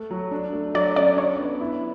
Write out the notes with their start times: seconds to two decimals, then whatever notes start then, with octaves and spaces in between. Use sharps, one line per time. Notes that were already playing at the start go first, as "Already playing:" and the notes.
Already playing: A3
0.11 F#3
0.31 D4
0.53 A3
0.74 F#3 D5
0.96 C#4 D5
1.17 D4 C#5
1.39 B3
1.61 E4